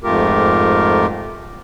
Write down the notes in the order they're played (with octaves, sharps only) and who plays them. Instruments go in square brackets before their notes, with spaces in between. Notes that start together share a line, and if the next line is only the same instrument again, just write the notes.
[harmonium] F2 G#2 A3 F4 G4 A#4